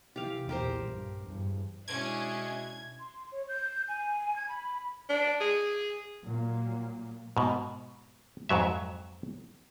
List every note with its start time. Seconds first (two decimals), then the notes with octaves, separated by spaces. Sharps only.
0.16 C3 E3 G4 F5
0.49 B1 E2 A#2 G4 A#4 C5
0.85 G2
1.23 E2 G2
1.88 B2 G#3 C#4 D4 E4 G#6
3.00 C6
3.32 C#5
3.49 G6
3.88 G#5
4.36 G#6
4.49 B5
5.10 D4
5.41 G#4
6.24 A#2 F#3 A#3
7.37 G#2 B2
8.49 F2 G#2 F#3 E5